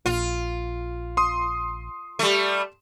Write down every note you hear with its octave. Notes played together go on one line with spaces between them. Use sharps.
A#1 F4
C6 D#6
G3 A3